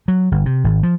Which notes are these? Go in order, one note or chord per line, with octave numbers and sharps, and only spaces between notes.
F#3
G1
C3
G#1
F3